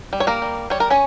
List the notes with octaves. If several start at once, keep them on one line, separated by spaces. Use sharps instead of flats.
G3
C#5
A#3 A#4
G3
G3 C#5
A#4
C#4 C#5